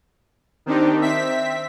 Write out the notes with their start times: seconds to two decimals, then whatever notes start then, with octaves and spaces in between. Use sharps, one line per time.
0.66 D#3 C4 D4 D#4 G4
1.02 C4 E5 B6